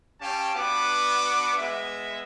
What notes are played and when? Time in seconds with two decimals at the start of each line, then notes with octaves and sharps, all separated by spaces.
0.21 C#4 G4 F5 G5 A5
0.55 B3 D4 F#4 B4 D6
1.57 G#3 B3 E5